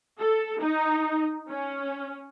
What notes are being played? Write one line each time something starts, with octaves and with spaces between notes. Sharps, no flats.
A4
D#4
C#4